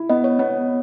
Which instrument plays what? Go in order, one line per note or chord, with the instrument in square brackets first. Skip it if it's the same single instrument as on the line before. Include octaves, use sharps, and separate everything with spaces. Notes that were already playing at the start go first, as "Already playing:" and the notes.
Already playing: [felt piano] E4
[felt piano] B3 [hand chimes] D#5
[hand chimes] C#5
[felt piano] B3 [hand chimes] C#5